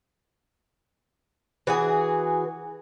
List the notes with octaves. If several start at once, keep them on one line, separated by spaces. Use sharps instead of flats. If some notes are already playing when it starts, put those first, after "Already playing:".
E3 F#4 G#4